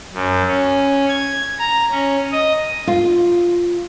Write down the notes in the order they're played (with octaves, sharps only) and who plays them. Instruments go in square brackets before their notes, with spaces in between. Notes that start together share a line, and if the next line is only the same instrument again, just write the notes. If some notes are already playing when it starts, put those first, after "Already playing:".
[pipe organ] F#2
C#4
G#6
A#5
C#4
D#5
[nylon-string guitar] F4